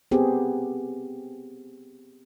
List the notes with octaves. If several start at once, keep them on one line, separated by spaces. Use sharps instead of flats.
B3 C4 G4 G#4